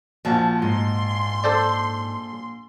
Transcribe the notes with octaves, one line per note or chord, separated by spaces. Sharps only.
A#1 F3 F#4 A5
G#2 C6
A4 C5 D5